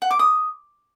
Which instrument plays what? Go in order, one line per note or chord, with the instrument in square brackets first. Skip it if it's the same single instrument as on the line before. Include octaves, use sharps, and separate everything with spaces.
[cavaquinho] F#5
D6
D#6